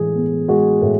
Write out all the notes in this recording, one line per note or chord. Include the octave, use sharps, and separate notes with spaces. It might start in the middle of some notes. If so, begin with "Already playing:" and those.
Already playing: A2 E3 G#3 G#4
B3
G#3 F#4
A2